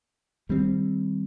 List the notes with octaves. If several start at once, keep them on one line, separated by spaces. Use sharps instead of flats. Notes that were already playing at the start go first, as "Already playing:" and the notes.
D#3 G3 C4